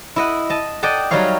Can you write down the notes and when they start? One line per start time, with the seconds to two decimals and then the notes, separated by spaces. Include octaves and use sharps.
0.16 E4 D#5 F#5
0.50 D#5 A5
0.83 D5 D#5 F#5 G5 A5
1.11 F#3 G3 D#4 A#4 C#5 F5